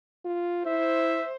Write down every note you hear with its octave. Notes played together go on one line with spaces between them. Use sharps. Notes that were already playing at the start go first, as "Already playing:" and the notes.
F4
E4 C5 E5